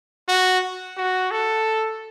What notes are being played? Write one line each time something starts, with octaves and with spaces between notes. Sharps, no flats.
F#4
F#4
A4